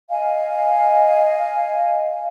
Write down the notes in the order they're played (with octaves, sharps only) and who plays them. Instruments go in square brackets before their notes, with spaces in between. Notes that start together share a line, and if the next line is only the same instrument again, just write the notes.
[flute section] D#5 F5 G#5